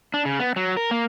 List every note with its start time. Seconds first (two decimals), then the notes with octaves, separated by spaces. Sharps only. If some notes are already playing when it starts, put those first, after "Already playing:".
0.14 D4
0.25 C#3
0.40 B3
0.56 F#3
0.77 A#4
0.91 A#3